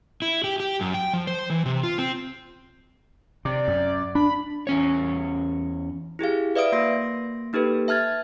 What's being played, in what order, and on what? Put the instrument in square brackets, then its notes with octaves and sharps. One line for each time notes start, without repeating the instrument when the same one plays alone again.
[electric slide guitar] E4
G4
G4
F#2
G5
F3
C5
E3
C3
F4
C4
[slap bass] C3 [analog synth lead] D5
[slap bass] F#2
[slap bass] D4 [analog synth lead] B5
[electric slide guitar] E2 C#4 C#5
[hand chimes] E4 G4 G#4 F5
B4 D5 E5 F5 D#6 D7
A#3 F#4 C6 A#6
A#3 D#4 G4 A4 B4
E5 A5 F6 G#6 A6